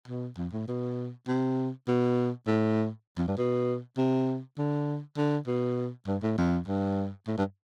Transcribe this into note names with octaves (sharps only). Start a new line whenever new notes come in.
B2
F2
A2
B2
C3
B2
A2
F2
G2
B2
C3
D3
D3
B2
G2
A2
F2
G2
A2
G2